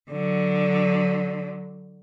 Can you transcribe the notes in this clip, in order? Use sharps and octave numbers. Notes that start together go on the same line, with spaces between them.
D3 F#3